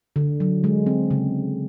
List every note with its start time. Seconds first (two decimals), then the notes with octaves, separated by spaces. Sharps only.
0.16 D3
0.40 F#3
0.64 G#3
0.87 C4
1.11 C#3